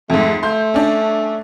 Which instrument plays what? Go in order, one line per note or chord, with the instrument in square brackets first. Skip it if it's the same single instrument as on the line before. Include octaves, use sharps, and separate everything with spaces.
[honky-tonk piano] F2 G#2 [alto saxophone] A3
[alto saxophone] A3 [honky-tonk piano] C6 G6
[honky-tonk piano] C#4 D4